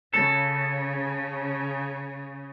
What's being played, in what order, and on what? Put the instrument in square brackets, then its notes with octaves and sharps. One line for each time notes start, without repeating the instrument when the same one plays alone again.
[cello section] C#3 [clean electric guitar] A4